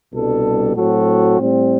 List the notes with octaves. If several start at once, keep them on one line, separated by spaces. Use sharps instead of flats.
C2 B2 G3 D4 A4
A2 F#3 C4 F#4 A4
A2 G3 C4